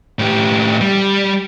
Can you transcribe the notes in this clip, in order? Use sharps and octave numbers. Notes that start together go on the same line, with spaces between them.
A2 G4
G3